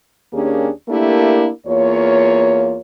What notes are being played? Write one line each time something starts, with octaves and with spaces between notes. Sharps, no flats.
D#2 A#3 C#4 D4 G4 G#4
A3 A#3 D4 E4 G4 A#4
E2 A#3 F4 C#5